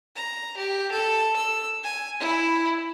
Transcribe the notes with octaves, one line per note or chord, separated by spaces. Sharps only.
A#5
G4
A4
E6
G#5
E4